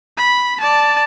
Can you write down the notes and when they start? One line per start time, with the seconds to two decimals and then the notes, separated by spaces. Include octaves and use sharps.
0.18 B5
0.61 D5 A5